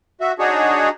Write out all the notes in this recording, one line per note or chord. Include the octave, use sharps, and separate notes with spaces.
F#4 E5
D4 D#4 F#4 G#4 C#5